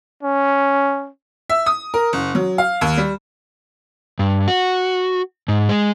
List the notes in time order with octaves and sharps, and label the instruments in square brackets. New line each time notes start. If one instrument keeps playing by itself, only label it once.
[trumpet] C#4
[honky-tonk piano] E5
D#6
A#4
F#1
F#3
F5
D#2
G3
[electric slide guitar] G2
F#4
G#2
G#3